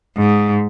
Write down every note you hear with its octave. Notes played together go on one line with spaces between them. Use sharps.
G#2